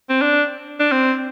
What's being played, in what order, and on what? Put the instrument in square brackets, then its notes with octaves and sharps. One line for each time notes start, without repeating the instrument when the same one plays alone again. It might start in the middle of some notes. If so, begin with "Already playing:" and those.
[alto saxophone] C4
D4
D4
C4